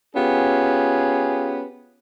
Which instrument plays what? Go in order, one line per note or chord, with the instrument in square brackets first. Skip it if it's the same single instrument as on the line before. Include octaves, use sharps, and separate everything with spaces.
[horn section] B3 C#4 F4 G4 G#4